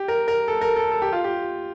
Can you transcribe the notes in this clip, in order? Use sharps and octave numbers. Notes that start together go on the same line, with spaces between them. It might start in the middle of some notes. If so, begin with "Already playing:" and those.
Already playing: G4
A#4
A#4
A4
A#4
A4
A4
G4
F4
G4